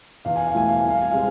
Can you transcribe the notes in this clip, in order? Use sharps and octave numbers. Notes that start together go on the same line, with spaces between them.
E2 F5
G#5
F5
B2 A3 E4 G#5
F5
C2 G#5
F5
G#5
C3 G#3 C4 F5